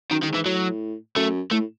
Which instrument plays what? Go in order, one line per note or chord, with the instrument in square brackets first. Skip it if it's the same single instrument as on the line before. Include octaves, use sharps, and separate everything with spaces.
[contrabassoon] F#2 [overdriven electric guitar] D#3
[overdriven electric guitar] D#3
[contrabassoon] G#2
[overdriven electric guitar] E3
[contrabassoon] A2 [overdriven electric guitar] F#3
[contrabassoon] F#2 [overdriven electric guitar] A3
[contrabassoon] A2 [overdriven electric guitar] A3